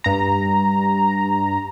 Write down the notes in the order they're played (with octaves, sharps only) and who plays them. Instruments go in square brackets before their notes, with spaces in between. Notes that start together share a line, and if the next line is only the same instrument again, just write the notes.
[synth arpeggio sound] G2 A#5